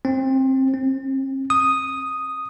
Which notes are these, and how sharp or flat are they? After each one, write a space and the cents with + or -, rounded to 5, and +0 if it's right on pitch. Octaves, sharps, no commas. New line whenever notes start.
C4 +20
C4 +45
D#6 +0